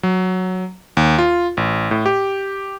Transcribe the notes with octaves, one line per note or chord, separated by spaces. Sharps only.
F#3
D#2
F4
A1
A2
G4